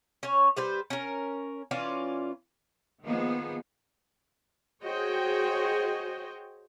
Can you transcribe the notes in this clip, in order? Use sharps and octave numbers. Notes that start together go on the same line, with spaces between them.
C#4 C#5
G3 B4 C5
C#4 A#4
E3 C#4 F4 D5
D#3 F3 A#3 B3 D#4 G#4
F#4 G#4 C5 C#5 D#5 G5